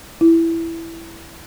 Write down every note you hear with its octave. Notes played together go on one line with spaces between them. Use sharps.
E4